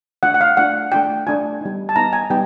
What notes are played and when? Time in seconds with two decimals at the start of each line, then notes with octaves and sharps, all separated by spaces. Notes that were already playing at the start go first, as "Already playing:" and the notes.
0.23 A3 D4 F4 F#5
0.34 F#5
0.41 F5
0.57 A3 D4 F4 F#5
0.92 A3 D4 F4 G5
1.27 A3 D4 F4 G#5
1.61 G3 B3 D#4
1.89 A5
1.96 G3 B3 D#4 A#5
2.13 G#5
2.30 G3 B3 D#4 G5